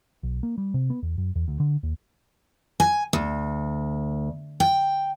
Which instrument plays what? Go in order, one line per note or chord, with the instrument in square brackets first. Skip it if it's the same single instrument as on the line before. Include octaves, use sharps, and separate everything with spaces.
[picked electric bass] B1
A#3
G3
C3
B3
E2
F#2
E2
D2
D3
D#2
[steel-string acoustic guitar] G#5
D2
G5